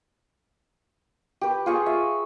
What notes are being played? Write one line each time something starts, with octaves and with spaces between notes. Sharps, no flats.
G4 B4
F4 G#4 C#6
E5